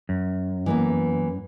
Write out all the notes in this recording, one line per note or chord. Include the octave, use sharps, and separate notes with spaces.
F#2
E3 A#3 B3